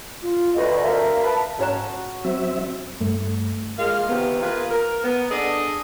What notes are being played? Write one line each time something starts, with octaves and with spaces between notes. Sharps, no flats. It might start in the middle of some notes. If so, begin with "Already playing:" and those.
F4
D2 B4 D#5
A#4 E5 F5
B4 A5 B5
G#2 C#4 F#4 C#5 A5 A#5 F#6
F#3 C4 E5
G2 A3
G#3 A#3 F4 F5
C3 D#3 B3
A#3 F4 G#4 B4
A#4
B3
D4 G#4 A4 D5 D#5 F#5